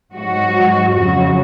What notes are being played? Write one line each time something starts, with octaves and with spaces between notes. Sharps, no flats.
G#2 F#3 F#4
F2 C#3 F#3 F#4